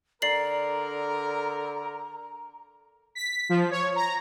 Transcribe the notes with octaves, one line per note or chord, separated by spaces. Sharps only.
D3 A#4 D5 A#5 C7 F#7
B6
F3
C#5
A#5